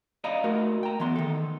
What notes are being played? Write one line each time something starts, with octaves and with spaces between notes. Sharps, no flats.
D5 D#5 F5 A#5 B5
A3 F#4 A#4
G5 A#5
E3 B3 C6
D#3 A4